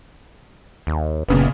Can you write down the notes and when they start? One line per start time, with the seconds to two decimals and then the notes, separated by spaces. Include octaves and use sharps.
0.87 D#2
1.28 F#1 A#2 C#3 B3